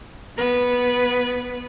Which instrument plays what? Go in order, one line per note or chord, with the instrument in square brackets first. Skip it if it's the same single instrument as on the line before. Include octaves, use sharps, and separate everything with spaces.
[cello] B3 B4